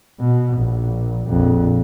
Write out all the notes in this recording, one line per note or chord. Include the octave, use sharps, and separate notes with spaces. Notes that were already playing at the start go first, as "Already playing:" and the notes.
B2
A#1
A#1 F2